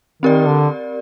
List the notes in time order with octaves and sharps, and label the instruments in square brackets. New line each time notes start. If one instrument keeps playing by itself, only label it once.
[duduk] D#3 [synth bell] C4 G4 A#4 D5
[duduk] D3